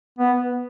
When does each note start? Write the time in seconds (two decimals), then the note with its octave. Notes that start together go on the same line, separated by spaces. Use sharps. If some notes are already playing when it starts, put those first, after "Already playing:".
0.19 B3